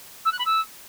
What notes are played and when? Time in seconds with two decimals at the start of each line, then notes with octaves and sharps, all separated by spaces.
0.25 E6
0.32 F#6
0.38 B5
0.45 E6